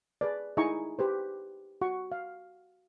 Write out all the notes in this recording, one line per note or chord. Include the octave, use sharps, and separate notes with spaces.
G#4 B4 D5
D#4 E4 G#4 G#5 A#5 C#6
G4 B4 C5
F#4 F#5 C#6
F5